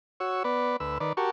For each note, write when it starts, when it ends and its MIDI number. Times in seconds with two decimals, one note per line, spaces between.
0.20 0.43 66
0.20 0.43 73
0.20 0.43 88
0.44 0.77 59
0.44 0.77 71
0.44 0.77 74
0.80 0.98 38
0.80 0.98 71
0.80 0.98 88
1.00 1.13 51
1.00 1.13 71
1.00 1.13 74
1.17 1.30 66
1.17 1.30 67
1.17 1.30 70
1.17 1.30 81
1.17 1.30 85